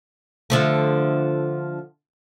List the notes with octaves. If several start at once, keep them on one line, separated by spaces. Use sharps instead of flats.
D3 F3 A3